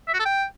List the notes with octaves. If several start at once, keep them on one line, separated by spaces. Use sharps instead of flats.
E5
F#4
A4
G5